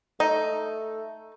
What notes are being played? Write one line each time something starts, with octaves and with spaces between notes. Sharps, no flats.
A3 D#4